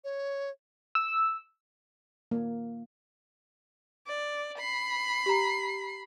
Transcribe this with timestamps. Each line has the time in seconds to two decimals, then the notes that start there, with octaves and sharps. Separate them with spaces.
0.04 C#5
0.95 E6
2.31 A#3
4.07 D5
4.58 B5 C7
5.26 G4 A#5